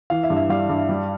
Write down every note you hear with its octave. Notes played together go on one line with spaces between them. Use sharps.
E3 F5
E5
G2
E5
G3 F5
G2
G3